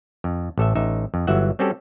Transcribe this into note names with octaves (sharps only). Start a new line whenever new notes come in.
F2
A1 A4 E5
A1 D#4 E5
F2
G1 E3 F#3 F#4 E5 F#5
G3 C4 C#4 F#4 G4 A4